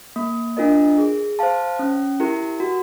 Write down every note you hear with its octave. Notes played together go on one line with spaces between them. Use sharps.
A#3
D4 F4 A#4 D#5
G#4
C5 F5 A5
C#4
E4 G4 A#4
F#4